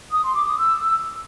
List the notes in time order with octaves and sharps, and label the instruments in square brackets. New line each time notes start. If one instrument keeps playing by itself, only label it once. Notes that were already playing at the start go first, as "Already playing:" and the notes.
[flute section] D#6
C6
D6
D#6
E6